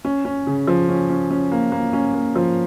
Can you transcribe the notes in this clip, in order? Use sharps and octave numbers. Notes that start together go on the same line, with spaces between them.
C#4
C#4
C#3
F3
C#4
C#4
C#4
A#3
A#3
C#4
A#3
F3